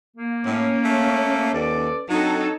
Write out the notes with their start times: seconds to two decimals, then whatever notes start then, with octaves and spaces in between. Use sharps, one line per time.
0.17 A#3
0.46 A2 C#4
0.85 A3
1.54 D#2 A4 B4 D5
2.09 F#3 C4 D4 D#4 A4 C#5